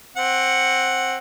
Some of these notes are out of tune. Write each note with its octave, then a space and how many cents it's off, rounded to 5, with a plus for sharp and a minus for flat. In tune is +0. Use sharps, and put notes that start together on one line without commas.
C4 +15 F#5 +0